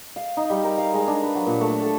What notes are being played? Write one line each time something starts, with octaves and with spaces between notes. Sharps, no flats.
F5
D#4
G3
A#4
F5
G#3
D4
B4
F#3
A#2
A3
A4